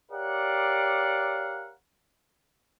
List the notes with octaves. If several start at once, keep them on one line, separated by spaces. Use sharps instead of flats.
G4 A#4 C#5 D5 F5 F#5